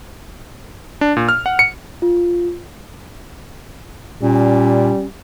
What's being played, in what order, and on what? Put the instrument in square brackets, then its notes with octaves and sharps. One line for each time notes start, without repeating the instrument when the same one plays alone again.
[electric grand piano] D4
A#2
F6
F#5
C#7
[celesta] F4
[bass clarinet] A#2 [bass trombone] G3 [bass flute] C#4